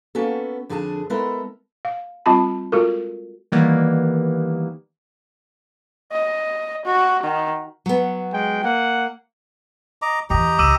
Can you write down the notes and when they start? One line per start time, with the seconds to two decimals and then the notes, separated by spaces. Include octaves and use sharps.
0.15 A#3 B3 C#4 F#4 A4
0.69 F2 D3 D4 G#4 G#5 A5
1.10 G#3 B3 E4 A4 A#4 E5
1.85 F5
2.26 G3 C4 F4 A5 B5
2.72 G#3 F4 F#4 A4 A#4
3.52 D#3 E3 G3 A#3 B3
6.12 D#5
6.86 F#4
7.23 D#3
7.86 F#3 B3
8.32 G#3 G5
8.63 A#3 F#5
10.02 D#5 A#5 D6
10.30 E2 E3 G4 D#5 A#5
10.59 C#2 E3 D6 E6 D#7